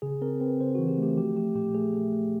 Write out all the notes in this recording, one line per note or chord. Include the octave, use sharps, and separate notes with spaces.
C#3 G#4
C4 A#4
C4 B4
C#3 C5
E3 F#4
G4
A3 G4
F3 G4
A3 G4
A#2 G4
A3 G#4
A3
A3